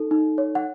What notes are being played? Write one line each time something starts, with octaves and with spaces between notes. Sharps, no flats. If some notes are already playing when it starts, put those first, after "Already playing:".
Already playing: D#4 A4
D#4
C#5
F#5